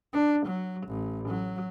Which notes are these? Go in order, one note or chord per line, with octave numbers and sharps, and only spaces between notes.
D4
F#3
A1
F#3